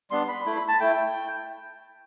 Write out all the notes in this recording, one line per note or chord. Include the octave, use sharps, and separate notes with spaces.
G3 B3 D4 C6
B5
A3 E4 B5
B5
A5
A3 E4 G5